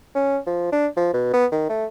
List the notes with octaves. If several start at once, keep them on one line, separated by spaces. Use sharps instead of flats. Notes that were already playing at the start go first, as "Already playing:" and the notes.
C#4
F3
D4
F3
B2
B3
D#3
A3